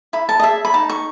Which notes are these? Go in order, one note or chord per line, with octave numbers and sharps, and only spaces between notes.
E4 B5
A5
D#5
G#4 E5
B5
D#4 A5
C#6